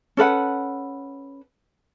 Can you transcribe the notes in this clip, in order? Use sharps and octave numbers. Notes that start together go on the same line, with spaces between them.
C#4 A4 B4 F#5